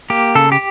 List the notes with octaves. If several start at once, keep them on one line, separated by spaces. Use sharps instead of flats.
A#3 G4
C#3 A4
G4